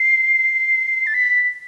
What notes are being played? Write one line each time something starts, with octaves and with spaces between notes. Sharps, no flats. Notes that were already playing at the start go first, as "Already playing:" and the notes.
Already playing: C7
A6
B6